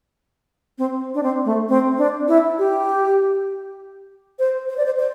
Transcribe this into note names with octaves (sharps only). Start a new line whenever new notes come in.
C4
D4
C4
A3
C4
D4
E4
G4
C5
C5
D5
C5
C5